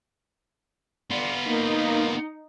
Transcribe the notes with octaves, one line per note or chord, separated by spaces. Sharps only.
G1 B3 F4 D5
A#3 D#4